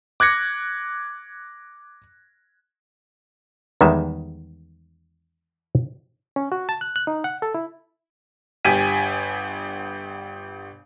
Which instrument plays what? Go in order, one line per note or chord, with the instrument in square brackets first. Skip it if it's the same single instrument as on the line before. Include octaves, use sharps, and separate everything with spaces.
[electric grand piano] D6 F#6 G#6 A#6 C#7
[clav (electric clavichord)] E2 D#3 G3 G#3 E5
[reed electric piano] C#4
F#4
A5
F#6
F#6
D#4
F#5
A4
E4
[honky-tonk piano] G1 G4 G#5 B6 D#7